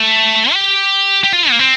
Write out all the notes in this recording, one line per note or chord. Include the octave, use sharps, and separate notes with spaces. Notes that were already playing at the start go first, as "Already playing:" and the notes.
Already playing: A3
G4
G4
F4
A#3
C4